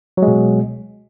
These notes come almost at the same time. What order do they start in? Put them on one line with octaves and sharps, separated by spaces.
F#3 G#3 B2